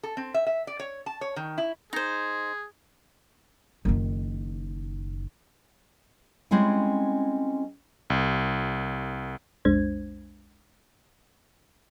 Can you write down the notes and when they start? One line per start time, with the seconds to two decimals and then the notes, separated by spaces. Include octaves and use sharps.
0.03 A4
0.17 C4
0.34 E5
0.47 E5
0.67 D5
0.80 C#5
1.06 A5
1.21 C#5
1.36 D#3
1.58 E4
1.93 D#4 G#4 C5
3.85 F#1 D#3
6.51 G3 G#3 C4 C#4 E4
8.10 C2
9.65 B1 F2 G#3 D4 C5 G#6